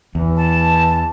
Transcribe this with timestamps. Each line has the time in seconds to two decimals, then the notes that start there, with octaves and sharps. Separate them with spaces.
0.15 E2 E3
0.35 A5